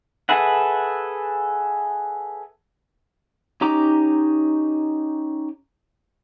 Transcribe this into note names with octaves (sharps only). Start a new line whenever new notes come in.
G#4 A4 B4 E5 F#5
C#4 D#4 G4 A#5 D6